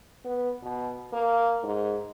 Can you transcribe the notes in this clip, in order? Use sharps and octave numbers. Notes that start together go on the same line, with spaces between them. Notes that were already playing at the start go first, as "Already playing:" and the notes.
B3
B2
A#3
G#2